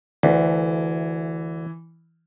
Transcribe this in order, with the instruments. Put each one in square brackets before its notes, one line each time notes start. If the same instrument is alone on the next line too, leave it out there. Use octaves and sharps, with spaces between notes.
[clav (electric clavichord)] D2 [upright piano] E3